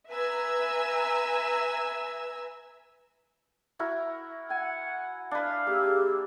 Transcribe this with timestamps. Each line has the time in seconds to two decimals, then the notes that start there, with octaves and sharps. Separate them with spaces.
0.10 B4 E5 G#5 A#5 E6
3.79 E4 F#4 A#4
4.50 F#5 G#5
5.31 D4 B4 F5
5.67 A#3 G4 G#4 E6